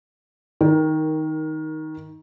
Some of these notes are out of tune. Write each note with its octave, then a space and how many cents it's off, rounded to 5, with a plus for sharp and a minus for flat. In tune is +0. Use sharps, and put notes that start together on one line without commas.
D#3 +10 A#4 +0